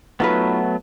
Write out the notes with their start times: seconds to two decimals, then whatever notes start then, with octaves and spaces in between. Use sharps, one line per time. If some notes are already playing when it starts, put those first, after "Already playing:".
0.20 F#3 A3 B3 D#4 F4 B4